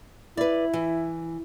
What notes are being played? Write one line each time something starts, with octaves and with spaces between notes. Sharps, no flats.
E4 B4 D5
E3